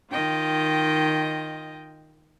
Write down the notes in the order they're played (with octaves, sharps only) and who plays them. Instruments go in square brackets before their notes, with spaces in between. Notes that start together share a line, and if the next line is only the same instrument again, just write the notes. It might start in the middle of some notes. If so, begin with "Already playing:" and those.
[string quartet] D#3 F4 D#5 G5